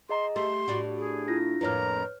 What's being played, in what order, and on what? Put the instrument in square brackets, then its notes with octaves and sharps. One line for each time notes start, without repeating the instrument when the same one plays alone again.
[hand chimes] G#4 D#5 A#5 [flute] C6
[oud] A3 [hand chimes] G4 [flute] C6
[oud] A2 D4 F#4
[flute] G#4
[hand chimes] E4 F4 A#6
[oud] F2 A2 A#3 [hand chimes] B4 C#5 F6 [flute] A#5